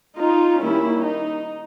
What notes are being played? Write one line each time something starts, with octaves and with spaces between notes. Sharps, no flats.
D#4 F4
D#3 G3 A#3 C#4 E4
D#4